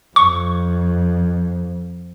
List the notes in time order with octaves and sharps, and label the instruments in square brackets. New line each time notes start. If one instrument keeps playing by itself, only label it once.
[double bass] F2 [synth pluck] C#6